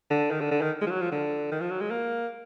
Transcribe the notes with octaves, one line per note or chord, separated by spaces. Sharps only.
D3
D#3
D3
D3
D#3
G#3
F3
F#3
F3
D3
D#3
F3
F#3
G#3
A#3